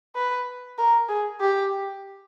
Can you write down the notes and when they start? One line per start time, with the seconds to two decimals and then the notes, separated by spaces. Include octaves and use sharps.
0.16 B4
0.78 A#4
1.09 G#4
1.40 G4